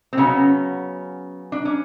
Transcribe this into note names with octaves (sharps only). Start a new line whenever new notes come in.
C4
C#3 F#3 B3 C#4
D4
C#4